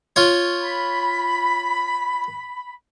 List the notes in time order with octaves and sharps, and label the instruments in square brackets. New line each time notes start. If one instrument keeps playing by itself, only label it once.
[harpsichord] F4 C#5
[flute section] B5